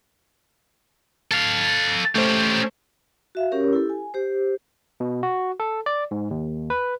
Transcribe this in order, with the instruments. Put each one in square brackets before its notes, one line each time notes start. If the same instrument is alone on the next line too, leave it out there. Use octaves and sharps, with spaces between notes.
[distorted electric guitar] A4 F5
[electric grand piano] A3 C5 [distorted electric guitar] C#4 G4
[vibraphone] F#4 E5 F5
C#4 G4 A#4 C#5
E4 G4 A4
G#5
G4 C5
[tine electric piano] B2
F#4
A4
D5
G#2
D#2
B4